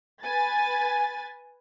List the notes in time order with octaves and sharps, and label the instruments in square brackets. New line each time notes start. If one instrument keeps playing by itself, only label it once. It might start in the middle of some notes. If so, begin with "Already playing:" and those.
[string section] B4 G#5 A6